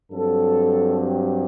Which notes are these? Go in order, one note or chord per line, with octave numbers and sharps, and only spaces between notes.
G2 F#3 C4 A4
G4